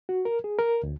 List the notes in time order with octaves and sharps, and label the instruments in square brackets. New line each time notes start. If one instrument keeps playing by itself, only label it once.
[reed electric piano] F#4
A#4
G#4
A#4
D2